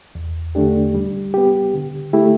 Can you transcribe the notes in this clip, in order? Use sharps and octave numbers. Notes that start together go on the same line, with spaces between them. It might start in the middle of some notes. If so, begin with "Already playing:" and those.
E2
D3 A3 D4 G4
G3
B3 G4
D3
A3 E4 G4